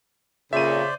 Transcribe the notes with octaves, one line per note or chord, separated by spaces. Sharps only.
F2 A#2 C#3 C5 D5 E5 D#7